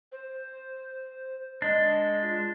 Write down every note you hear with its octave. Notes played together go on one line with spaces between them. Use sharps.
C5
G#3 D4 D#5
F4